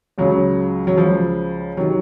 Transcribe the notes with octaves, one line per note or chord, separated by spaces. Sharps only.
C#2 C#3 F#3
F#3
C#2 C#3 F3
C3 D#3 F#3